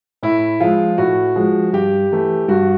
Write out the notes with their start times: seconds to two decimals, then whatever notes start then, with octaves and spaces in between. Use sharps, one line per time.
0.23 A2 E4
0.60 F3 G#3 F4
0.98 A2 F#4
1.36 F3 G#3
1.73 G2 G4
2.12 E3 A3
2.48 G2 F#4